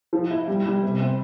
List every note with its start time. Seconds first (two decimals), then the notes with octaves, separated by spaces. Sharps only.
0.13 F3
0.30 E4
0.48 G3
0.66 G3
0.83 C3
1.01 C4